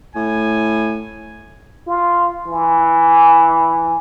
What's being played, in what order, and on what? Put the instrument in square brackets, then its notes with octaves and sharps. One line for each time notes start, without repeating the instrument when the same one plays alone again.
[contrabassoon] A2 [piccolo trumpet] G#5
[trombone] F4
E3